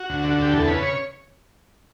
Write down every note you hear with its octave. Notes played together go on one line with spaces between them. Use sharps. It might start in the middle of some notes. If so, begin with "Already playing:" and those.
Already playing: F#4
D2
D3
F#4
D2 G4
E2 A4
C#3 B4
C#5